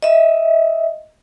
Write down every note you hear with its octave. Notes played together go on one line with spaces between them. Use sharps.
D#5 E5